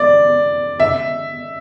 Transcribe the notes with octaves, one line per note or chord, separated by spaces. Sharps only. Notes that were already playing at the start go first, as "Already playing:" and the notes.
Already playing: D5
E5